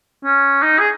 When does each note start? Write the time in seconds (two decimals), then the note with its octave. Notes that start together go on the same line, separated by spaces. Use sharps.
0.25 C#4
0.63 D#4
0.80 G#4